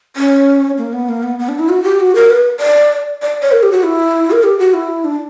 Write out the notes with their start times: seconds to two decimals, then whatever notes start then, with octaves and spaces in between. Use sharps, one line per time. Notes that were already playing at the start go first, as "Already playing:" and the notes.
0.16 C#4
0.78 A#3
0.93 B3
1.09 A#3
1.23 B3
1.39 B3
1.49 D4
1.59 E4
1.69 F#4
1.84 G4
2.00 F#4
2.15 A#4
2.30 B4
2.60 D5
3.22 D5
3.42 C#5
3.52 A#4
3.63 G4
3.72 F#4
3.83 E4
4.31 A#4
4.43 G4
4.59 F#4
4.74 E4
5.04 D4